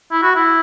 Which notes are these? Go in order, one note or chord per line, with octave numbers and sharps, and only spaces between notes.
E4
F#4
E4